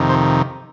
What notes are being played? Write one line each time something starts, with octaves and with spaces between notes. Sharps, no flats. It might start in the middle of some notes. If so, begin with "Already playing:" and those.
Already playing: F2 C3 D#3
C5